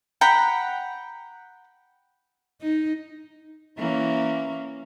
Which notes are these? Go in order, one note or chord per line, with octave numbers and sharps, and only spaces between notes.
F#5 G5 A#5 B5
D#4
E3 A#3 C#4